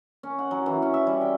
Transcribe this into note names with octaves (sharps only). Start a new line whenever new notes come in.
C#4
F#5
F#3
E3
C#4
E5
G3
G5